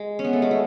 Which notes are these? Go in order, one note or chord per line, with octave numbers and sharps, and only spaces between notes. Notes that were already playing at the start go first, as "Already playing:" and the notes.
Already playing: G#3
C#4
B3
A3
G#3
A3